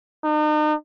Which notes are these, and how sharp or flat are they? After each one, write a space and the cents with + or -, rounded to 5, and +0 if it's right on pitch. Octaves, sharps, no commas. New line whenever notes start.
D#4 -40